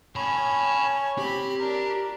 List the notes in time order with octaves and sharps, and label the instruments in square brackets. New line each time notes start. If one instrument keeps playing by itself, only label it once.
[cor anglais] C#4 [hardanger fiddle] C#5 [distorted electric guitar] A5 B5
[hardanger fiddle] C4 B5 [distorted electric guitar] G4
[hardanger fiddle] D4 [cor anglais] A#4